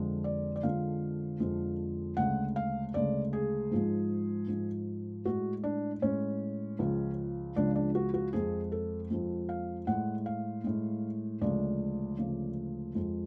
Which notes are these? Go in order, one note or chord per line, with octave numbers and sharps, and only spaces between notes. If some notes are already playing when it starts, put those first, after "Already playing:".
Already playing: F2 D3 F3 G#3
D5
D5
F2 D3 F3 G#3 F5
F2 D3 F3 G#3
D2 C#3 G#3 F#5
F5
D2 C#3 G#3 D5
G#4
G#2 F3 G#3
G#2 F3 G#3
A2 G#3 F#4
D4
A2 G#3 C#4
C#2 C#3 F3 G#3
C#2 C#3 F3 G#3 D4
D4
F#4
F#4
F2 F3 G#3 G#4
A4
F2 F3 G#3
F5
A2 G#3 F#5
F5
A2 G#3
D2 C#3 F3 G#3 D5
D2 C#3 F3 G#3
F2 F3 G#3